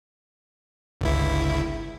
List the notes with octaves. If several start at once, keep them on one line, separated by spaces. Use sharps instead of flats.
G1 C#2 E4